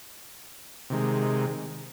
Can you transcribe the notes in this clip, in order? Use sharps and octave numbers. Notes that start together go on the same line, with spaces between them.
C3 D#3 G#3